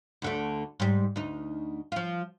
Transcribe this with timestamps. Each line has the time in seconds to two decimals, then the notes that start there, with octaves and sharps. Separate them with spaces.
0.22 D2 D3 A3
0.80 G#2 G3
1.16 D2 D#4
1.92 F3 F4